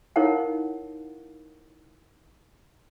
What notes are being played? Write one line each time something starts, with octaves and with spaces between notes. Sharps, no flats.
D#4 E4 A#4 C#5 F5 F#5